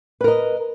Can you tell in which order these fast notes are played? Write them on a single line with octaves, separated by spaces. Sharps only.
B4 A#4 D#5